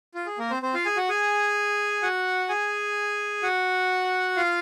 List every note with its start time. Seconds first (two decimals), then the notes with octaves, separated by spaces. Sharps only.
0.15 F4
0.26 G#4
0.39 A#3 A#4
0.51 C4 C5
0.62 C4 C5
0.74 F4 F5
0.86 G#4 G#5
0.97 F#4 F#5
1.09 G#4 G#5
2.03 F#4 F#5
2.49 G#4 G#5
3.43 F#4 F#5
4.37 F4 F5